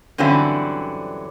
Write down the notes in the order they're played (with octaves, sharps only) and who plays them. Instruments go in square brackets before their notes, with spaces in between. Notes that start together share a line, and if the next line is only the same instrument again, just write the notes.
[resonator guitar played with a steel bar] G2 D3 E3 F#3 C4 C#4